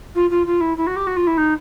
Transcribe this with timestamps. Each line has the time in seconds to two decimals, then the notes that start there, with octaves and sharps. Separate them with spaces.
0.15 F4
0.30 F4
0.47 F4
0.61 E4
0.77 E4
0.87 F#4
0.96 G4
1.07 F#4
1.17 F4
1.27 E4
1.38 D#4